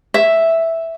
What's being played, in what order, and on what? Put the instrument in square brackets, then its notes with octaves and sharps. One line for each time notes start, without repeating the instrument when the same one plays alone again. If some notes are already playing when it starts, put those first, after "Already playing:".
[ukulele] E5